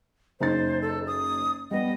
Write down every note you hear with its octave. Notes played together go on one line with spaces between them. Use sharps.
F#1 D#4 C5 A6
A4
D#6
G3 B3 D#5